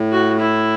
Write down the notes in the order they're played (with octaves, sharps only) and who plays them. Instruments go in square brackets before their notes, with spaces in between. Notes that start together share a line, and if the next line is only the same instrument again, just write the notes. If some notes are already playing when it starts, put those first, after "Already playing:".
Already playing: [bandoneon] A2
[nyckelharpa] F#4
E4